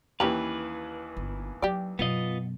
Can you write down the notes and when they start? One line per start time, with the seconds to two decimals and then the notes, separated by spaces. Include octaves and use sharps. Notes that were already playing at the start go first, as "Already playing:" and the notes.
0.20 D#2 E3 C#4 G4 B4 A#5
1.17 G1
1.62 F#3 G4 D5
1.99 F#2 B2 B3 F4 D#5